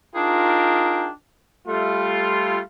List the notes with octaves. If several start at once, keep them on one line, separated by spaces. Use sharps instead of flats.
D4 D#4 F4 G#4 A#4 G5
G3 A3 F4